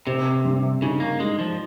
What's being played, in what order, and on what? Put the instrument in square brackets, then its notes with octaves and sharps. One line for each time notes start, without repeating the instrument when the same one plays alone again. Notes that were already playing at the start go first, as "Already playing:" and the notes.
[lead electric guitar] C3 [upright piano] C4
[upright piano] G2
[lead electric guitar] C#3 [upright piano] D#4
[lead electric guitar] A#3
[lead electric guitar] G#3 [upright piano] D#4
[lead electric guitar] F3